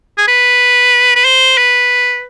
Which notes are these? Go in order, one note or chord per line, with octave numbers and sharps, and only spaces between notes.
G#4
B4
B4
C5
B4